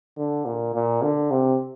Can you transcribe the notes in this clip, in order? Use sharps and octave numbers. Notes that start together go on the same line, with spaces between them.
D3
A#2
A#2
D3
C3